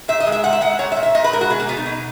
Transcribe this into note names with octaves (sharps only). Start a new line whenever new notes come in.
A#2 E5
D#5
G#3
E5
A#2 F#5
E5
G#3 F#5
F#5
A#2 C#5
E5
A#2
E5
A#2 D#5
B4
G#3 A#4
F#4
B2 G#4
A#3
B2 B3
D#4
B2